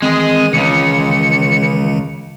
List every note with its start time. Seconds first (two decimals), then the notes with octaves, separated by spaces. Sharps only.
0.02 D#3 E3 G#3 C4 G#4
0.53 C#2 C#3 C#7